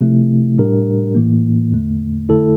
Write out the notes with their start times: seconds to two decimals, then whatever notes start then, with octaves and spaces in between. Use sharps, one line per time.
0.01 C3 F3 A3 E4
0.58 A2 G3 D4 G4 A#4
1.15 A2 E3 A#3
1.72 E2 D3 A3
2.29 F2 D3 A3 E4 A4